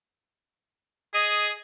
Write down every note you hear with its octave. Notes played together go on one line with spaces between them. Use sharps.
G#4 D#5